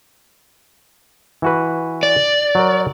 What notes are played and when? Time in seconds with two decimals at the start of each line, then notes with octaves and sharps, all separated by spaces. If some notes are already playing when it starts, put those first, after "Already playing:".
1.42 E3 F#4 B4
2.03 D5
2.55 F#3 A#4